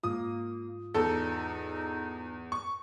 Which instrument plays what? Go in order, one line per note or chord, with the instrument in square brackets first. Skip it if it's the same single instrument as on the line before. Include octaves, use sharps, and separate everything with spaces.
[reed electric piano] G#2 F4 [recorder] A#3 [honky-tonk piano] D#6
[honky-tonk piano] E2 [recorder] D#4 [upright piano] A4
[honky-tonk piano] C#6